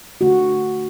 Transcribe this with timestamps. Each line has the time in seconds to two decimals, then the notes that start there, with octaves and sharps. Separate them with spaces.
0.21 D3 A3 F#4